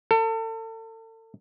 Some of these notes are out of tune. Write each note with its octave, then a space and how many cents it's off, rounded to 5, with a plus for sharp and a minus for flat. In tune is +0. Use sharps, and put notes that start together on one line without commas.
A4 +35